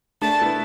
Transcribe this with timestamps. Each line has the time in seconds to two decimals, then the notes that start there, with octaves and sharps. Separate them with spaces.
0.22 A3 D4 A5
0.42 B3 E4